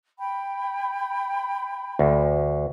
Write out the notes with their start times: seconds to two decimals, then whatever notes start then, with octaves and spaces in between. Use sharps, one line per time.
0.18 G5 B5
1.99 D2